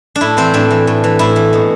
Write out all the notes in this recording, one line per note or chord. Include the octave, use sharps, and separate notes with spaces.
D4
A2 E4
E3 C4
A2 D4
E3
A2
E3
A2 E4
E3
B2